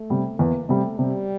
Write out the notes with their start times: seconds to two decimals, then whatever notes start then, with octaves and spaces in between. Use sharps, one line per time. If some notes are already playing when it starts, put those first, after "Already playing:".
Already playing: A3
0.10 C3 G3
0.39 E2 A#3
0.69 C3 G3 A3
0.99 C3 G3